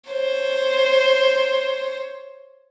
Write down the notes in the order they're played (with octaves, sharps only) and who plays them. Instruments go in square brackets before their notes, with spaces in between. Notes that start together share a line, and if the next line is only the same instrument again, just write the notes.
[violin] C5 C#5